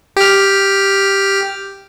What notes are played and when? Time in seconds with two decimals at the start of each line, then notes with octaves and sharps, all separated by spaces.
0.17 G4 F6